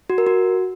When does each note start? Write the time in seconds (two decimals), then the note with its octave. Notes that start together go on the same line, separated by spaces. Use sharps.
0.10 F#4
0.18 A#4
0.27 F#4